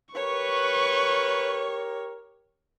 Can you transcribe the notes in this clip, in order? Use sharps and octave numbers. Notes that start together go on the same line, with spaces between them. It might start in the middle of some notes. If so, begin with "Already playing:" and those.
G4 A#4 B4 C#5 C#6